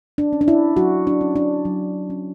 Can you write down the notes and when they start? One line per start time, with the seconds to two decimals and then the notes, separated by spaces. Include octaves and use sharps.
0.18 D4
0.33 C#4
0.41 D4
0.48 E4
0.77 F#3 F#4
1.07 D4
1.21 C#4
1.36 D4
1.65 F#3
2.10 C#4